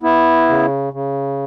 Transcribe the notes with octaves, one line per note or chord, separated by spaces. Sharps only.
B3 E4
C#3
C#3